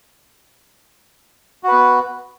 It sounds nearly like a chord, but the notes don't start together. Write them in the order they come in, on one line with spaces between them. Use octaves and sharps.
F#4 B4 B3